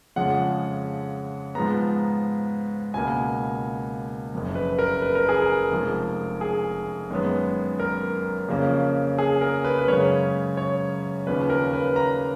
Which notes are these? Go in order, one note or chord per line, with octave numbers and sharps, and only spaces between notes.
F2 C#3 F3 G#3 F#5
G#2 F3 G#3 B3 A#5
C#2 B2 A#3 G#5
F#1 F2 F3
B4
A#4
B4
A#4
G#4
A#4
F1 F2 F3 G#3
G#4
F#2 D#3 G#3 B3
A#4
F2 C#3 F3 A#3 C#4
G#4
A#4
B4
B4
F#2 C#3 G#3 C#4 C#5
C#5
D#2 C#3 F3 A#3 C#4 B4
A#4
B4
A#5